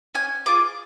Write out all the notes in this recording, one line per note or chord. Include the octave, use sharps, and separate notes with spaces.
C#4 G#5
F4 G#4 D6